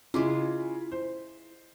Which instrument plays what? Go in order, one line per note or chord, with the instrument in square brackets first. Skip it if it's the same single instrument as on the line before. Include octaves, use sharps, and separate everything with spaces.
[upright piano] C#3 D6 [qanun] G#3 F4 [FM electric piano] E4
[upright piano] C5